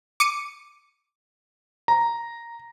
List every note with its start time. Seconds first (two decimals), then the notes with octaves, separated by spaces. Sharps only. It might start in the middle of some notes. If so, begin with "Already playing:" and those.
0.20 D6 C#7 D#7
1.88 A#5